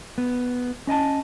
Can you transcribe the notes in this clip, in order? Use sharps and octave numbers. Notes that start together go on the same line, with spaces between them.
B3
C#4 D#5 G#5 A5